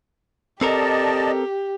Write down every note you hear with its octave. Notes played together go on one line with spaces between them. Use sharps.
C4 G4 A4 A#4 D5 D#5 A5